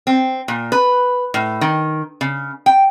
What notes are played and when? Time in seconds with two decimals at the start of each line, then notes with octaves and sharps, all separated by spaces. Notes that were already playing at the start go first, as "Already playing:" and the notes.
0.07 C4
0.48 A#2
0.72 B4
1.34 A2
1.61 D#3
2.21 C#3
2.66 G5